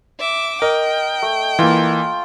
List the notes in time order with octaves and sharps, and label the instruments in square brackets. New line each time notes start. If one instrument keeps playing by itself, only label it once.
[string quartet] E5 D6
[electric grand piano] A#4 [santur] D#5 [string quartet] G5
[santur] A3
[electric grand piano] E3 A#3 [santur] F4